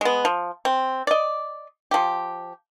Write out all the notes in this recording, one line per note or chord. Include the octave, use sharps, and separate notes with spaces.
G#3 B3
F3
C4
D5 D#5
F3 G4